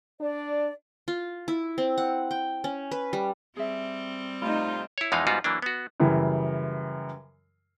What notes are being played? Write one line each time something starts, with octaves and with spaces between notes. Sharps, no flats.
D4 D5
F4
E4
C4
F#5
G5
C#4
B4
G3
G3 C4 G#4 E5
C3 A3 D#4 F4 C5 D5 D#5 B5
E4 C#5
E2 E3 F3 G#3 D#4 F5
G#2 G3 B3 F4 F#4
E3 F#3 A#3 D4
B3 F#4
F#2 C#3 E3 G3